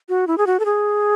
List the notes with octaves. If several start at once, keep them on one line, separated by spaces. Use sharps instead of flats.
F#4
E4
G#4
F#4
A4
G#4